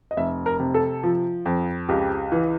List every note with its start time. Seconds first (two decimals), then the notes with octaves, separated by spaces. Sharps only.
0.11 D#5
0.17 F1 E5
0.46 A#4
0.60 C3
0.74 A4
1.03 F3
1.46 F2
1.89 C#2 G4
2.32 E3